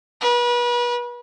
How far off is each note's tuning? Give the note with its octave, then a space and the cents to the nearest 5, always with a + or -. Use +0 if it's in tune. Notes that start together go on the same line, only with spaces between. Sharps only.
B4 -35